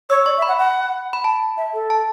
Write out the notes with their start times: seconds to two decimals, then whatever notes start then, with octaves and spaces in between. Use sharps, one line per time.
0.10 C#5 E6
0.26 D5 C#6
0.38 E5
0.42 B5
0.48 F#5
0.59 F#5
1.13 B5
1.24 A5
1.57 E5
1.74 A4
1.90 A5